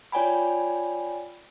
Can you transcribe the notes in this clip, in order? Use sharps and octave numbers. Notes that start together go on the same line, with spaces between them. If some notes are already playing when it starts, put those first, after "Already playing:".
F4 C#5 D5 G5 G#5 B5